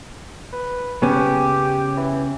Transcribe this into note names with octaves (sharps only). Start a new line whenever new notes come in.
B4
C#3 B3 C#4 G4
E3